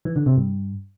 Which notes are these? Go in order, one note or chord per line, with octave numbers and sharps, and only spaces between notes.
E3
D3
C3
G2